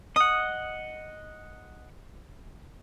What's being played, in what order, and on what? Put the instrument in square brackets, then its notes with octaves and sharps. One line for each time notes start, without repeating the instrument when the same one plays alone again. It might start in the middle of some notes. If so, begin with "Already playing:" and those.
[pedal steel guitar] D#5 F#5 [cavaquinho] D#6